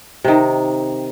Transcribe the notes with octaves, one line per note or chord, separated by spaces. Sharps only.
C3 D#3